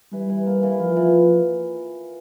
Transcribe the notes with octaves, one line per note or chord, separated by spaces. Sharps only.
E3 G3
E3
A#3
E3
F3 F4
E3